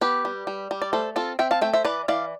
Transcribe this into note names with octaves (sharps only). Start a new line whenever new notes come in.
B3 G4 B4
G3
G3
G3
D5
A3 A4 C5
C4 F4 A4
C4 E5 G5
F5 A5
A3 E5 G5
C5 E5
E3 B4 D5
E3 D5 F5